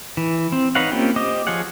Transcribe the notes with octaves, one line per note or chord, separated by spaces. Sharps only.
E3
C4
D#4 B4 C#5 F5 F#5
A#3 C4 C#4 F4 G4
G4 C5 D#5 D6 D#6
F3 F4 G#4 C#5 F#5